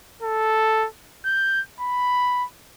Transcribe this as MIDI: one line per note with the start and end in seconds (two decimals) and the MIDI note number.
0.22 0.88 69
1.25 1.61 91
1.81 2.44 83